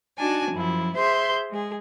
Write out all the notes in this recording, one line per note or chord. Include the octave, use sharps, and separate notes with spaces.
D4 D#4 F#4 G#5 A5
F#2 F3 E4
G#4 C5 E5 C6 G6
G#3 G#4